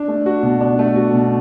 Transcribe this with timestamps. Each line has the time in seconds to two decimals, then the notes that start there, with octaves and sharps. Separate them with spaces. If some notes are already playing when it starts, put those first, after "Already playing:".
Already playing: D4
0.08 A3
0.26 F#4
0.43 B2
0.61 D4
0.79 A3
0.96 F#4
1.14 B2